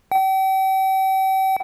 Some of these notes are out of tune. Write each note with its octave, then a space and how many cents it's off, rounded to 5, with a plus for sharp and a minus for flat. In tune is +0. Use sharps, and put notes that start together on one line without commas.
G5 -40